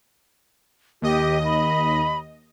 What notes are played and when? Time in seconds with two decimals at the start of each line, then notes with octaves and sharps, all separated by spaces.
1.02 D#2 G4 D#5
1.44 B5